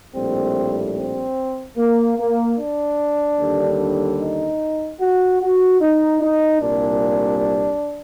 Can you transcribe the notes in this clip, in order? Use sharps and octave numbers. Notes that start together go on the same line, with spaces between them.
A#1 A2 G3 C4
C4
A#3
A#3
D4
D#2 D3 G3
D#4
F#4
F#4
D#4
D#4
C2 A#2 G3 D4